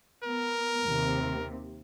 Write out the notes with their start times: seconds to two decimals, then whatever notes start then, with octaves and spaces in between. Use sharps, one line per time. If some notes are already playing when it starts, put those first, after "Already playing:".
0.24 B3 A#4
0.84 D#2 C3